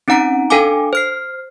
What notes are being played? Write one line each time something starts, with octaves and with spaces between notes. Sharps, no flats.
C4 C#4 D#4 F#5 A#5 D7
D4 A4 F5 G5 G#5 D6
C5 F6 C7